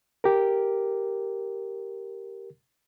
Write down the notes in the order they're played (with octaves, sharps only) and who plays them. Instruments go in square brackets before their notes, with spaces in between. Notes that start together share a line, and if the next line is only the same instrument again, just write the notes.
[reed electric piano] G4 A#4